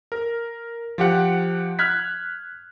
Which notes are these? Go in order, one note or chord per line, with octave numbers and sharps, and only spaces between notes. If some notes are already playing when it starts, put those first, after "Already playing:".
A#4
F3 G4 F#5
F6 F#6 G#6 B6